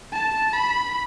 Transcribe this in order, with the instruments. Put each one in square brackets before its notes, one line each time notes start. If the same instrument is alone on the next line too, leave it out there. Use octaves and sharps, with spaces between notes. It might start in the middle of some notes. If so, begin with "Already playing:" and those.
[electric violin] A5
B5